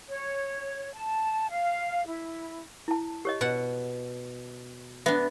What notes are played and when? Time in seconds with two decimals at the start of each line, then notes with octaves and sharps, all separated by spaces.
0.08 C#5
0.94 A5
1.48 F5
2.07 E4
2.88 E4 A5
3.25 G4 C#5 D#5
3.41 B2 F#5
5.06 B3 D4 E5